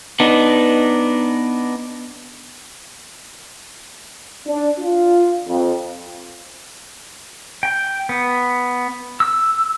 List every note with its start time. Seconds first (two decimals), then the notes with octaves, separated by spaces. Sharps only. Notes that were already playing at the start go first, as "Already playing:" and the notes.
0.20 B3 D4 D#4
4.48 D4
4.79 F4
5.47 F2
7.63 G5
8.09 B3
9.20 E6